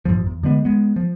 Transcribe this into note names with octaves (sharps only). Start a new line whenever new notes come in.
A1 G2 A#2 F3
E2
D3 G3 G#3 B3
G#3 B3
F3